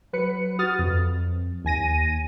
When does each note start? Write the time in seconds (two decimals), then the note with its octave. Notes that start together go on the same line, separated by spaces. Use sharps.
0.13 F#3 B4 C#7
0.59 F#4 D#6 F6 A6
0.79 F2
1.65 D#2 G#5 A#6 D#7